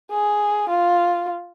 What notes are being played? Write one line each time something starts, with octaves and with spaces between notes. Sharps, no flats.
G#4
F4